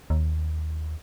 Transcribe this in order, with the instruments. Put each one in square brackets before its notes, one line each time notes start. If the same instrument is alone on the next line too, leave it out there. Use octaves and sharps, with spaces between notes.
[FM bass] D#2